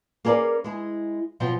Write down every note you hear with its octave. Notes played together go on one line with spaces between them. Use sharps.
A#3 C#4 G#4 A#4 B4 D5
G#3 E4 G#4
B2 F3 F#3 B3 C4